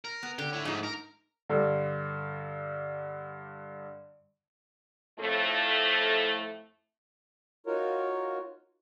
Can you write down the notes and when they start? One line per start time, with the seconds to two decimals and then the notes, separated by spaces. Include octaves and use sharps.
0.05 A#4
0.23 B3
0.39 D3 G4
0.53 E4 C#5
0.65 G#2 F3 A3 D#4
0.83 A#4
1.49 G2 D3
5.20 F2 A2 A3
7.66 D#4 F4 F#4 A#4 C#5